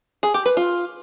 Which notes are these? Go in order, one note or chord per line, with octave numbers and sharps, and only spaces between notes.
G#4
G4
B4
F4